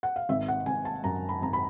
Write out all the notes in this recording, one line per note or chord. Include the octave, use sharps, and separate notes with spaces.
F#5
F5
G#1 E5
F#5
G#1 G#5
A5
F#2 A#5
B5
G#1 A#5
B5